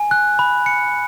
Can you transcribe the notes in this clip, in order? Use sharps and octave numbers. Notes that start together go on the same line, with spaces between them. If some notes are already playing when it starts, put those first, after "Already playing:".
Already playing: G#5
F#6
B5
C#7